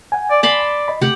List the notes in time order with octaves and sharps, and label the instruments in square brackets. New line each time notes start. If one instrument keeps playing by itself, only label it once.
[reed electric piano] F#5 G#5
[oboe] D5
[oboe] D5 [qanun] A5 B5 C6
[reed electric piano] D#5 B5
[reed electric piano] C3 A3 [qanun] G4 F#5